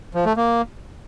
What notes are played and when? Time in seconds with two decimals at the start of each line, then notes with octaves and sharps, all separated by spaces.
0.15 F3
0.26 A3
0.37 A#3